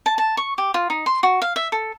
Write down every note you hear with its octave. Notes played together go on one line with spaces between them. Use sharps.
A5
A5
C#6
G4
F4
D#4
C6
F#4
F5
E5
A4